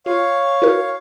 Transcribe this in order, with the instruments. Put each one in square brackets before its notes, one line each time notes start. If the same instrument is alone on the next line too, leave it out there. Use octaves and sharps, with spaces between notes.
[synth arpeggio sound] F4 [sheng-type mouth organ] C#5 F5
[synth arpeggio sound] E4 F#4 A#4